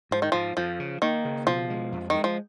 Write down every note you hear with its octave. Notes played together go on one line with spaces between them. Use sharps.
G#2 F3
D#3
G#2 F3
F2 F3
C#3
D#3 A#3
C#3
B2 F3
G#3
F2
D#3 G#3
F3